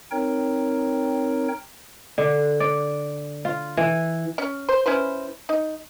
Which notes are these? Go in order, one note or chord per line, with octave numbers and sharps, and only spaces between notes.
C4 D#4 A#4 C#5 G5
D3
D5
F4
E3
C#4
C5
C#4 E4 B4 C5
D#4